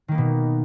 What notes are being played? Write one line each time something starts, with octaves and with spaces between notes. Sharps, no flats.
B2 D#3 A#3 B3